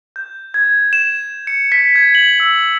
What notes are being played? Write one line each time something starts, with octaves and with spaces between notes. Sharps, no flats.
G6
G#6
E7
C#7
B6
G#6
F#7
E6